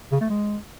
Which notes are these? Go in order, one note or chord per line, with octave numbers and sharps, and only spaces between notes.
C#3
A3
G#3